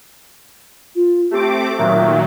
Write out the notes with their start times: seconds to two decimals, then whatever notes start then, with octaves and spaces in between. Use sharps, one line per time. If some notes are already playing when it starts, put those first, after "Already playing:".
0.95 F4
1.31 A3 C4 G4 D6
1.78 A#2 D#3 F#3 E5